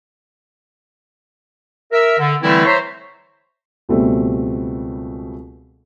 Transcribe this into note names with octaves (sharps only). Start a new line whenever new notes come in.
A#4 E5
D3
D3 E3 G3 A3 C4 E4
C5 C#5 E5 A#5 C6 C#6
C#2 B2 G3 A3 C4